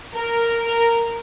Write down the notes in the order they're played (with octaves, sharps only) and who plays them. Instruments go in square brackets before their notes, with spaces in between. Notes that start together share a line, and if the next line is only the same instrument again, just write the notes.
[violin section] A#4